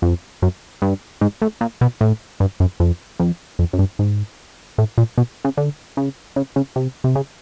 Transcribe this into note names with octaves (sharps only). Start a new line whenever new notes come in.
F2
F#2
G2
G#2
A2
A#2
B2
A2
G2
F#2
F2
F2
F2
F#2
G2
G#2
A2
A#2
B2
C#3
D3
C#3
C#3
C#3
C3
C3
C#3